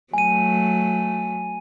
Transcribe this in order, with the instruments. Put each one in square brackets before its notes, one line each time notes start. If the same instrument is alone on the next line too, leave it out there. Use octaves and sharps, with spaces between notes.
[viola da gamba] F#3 A3 [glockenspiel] G#5 D#7